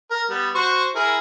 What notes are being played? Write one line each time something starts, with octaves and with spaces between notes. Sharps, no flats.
A#4
G3 B3
F#4 C5 C#6
E4 G#4 A#4